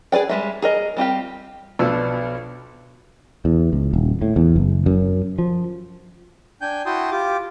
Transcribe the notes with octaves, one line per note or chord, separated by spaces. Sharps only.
G#4 B4 D5 G5
G3 G#3 E5
G#4 A#4 D#5
G3 C4 F4 G4
B1 B2 F3 B3 D4 E6
E2
C#2
D#1
A2
E2
F#1
F#2
F3
D4 G5 G#5 G6
E4 F#4 G5 A5 C6 D#6
F4 G4 D6